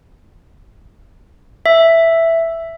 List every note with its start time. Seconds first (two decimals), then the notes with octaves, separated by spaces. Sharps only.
1.66 E5